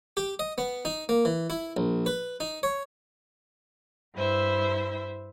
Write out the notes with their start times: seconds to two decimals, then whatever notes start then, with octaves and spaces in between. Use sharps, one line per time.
0.17 G4
0.39 D#5
0.58 B3
0.85 D#4
1.09 A#3
1.25 E3
1.50 E4
1.77 A#1
2.06 B4
2.40 D#4
2.63 C#5
4.15 G2 E4 C5 E5